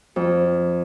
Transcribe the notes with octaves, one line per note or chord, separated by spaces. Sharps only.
F2